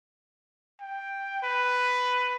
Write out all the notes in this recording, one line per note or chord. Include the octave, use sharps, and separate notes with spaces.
G5
B4